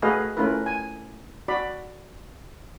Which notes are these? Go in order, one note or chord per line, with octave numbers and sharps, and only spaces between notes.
A3 F#4 G#4 B4 D#5 F5
A3 C#4 E4 F4 A#4 B4
G#5
F#4 D5 B5